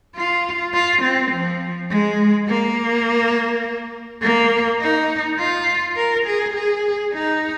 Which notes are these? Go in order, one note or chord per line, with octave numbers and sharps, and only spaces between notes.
F4
F4
C4
F3
G#3
A#3
A#3
D#4
F4
A#4
G#4
G#4
D#4